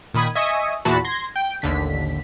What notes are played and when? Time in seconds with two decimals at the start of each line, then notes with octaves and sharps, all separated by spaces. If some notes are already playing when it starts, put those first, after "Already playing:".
0.14 A#2 D#3 B5 D#6 G#6
0.35 D#5 E5 G#5 C#6 D#6
0.85 E2 A#2 E3 F#4 A5 B5
1.04 C6 G#6 A#6
1.36 G5
1.62 A1 D#2 D3 B6